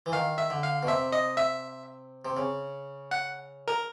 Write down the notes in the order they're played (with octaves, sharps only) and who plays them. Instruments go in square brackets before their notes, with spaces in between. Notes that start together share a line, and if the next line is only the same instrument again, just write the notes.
[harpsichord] E3
[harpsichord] D#3 [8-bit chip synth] F5
[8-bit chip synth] E5
[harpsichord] D3
[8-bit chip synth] F5
[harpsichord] B2
[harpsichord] C3 [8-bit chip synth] E5
[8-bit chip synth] D#5
E5
[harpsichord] C3
C#3
[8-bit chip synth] F#5
A#4